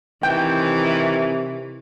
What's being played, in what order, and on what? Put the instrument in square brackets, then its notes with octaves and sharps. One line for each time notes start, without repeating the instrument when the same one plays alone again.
[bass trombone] C3 [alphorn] D#3 [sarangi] E3 [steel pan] G5